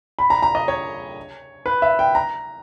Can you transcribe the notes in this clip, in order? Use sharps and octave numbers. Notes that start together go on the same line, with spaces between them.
B5
A#5
A#5
D#5
C#5
B4
E5
G5
A#5